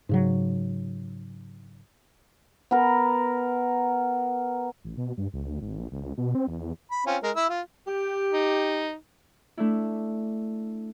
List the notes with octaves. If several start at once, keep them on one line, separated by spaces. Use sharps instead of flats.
G#2 C#3 F#3
B3 A#4
A1
B2
G2
C#2
D2
G#1
A#1
C#2
B2
C4
E2
B5
C4 C#4 F4
G#3 A#4
E4 E6
F4
G4
D#4
A3 D4 E4